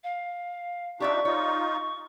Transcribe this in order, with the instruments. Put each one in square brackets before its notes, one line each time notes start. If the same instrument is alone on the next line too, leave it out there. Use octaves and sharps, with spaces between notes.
[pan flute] F5
[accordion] D4 D#4 F4 [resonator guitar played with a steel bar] G4 D5 E5 [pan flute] C#6
[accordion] D#4 F4 [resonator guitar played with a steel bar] C#5